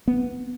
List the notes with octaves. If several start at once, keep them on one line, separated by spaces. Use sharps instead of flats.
B3